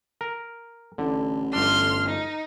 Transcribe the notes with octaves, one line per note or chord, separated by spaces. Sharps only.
A#4
A1 D3
G1 D4 C6 F6
D#4